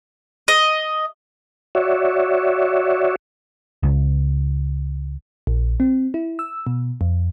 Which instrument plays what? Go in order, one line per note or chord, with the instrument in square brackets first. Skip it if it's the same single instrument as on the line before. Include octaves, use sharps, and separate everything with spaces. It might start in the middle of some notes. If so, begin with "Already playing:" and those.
[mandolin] D#5
[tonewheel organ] F#4 C#5 D5 E5
[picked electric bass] C#2
[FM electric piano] A#1
C4
E4
E6
B2
F2